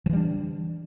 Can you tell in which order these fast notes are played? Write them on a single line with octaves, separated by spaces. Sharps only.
F3 E3 G3 D4